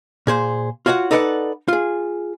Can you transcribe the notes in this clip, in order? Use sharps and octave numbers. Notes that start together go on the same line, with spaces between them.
A#2 G#4 C5
F4 F#4 C#5 F5 F#5
D#4 A4 B4 D5 D#5 F#5
F4 G#4